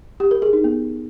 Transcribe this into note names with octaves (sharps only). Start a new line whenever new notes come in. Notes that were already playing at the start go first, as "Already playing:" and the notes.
G4
A#4
G#4
D#4
B3